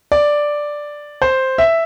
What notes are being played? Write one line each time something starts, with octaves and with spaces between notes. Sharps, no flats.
D5
C5
E5